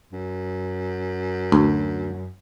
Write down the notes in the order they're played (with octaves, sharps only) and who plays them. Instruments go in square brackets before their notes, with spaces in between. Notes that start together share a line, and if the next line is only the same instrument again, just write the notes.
[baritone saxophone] F#2
[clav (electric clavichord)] D2